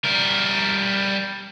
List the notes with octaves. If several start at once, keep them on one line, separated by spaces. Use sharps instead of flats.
G3 A#4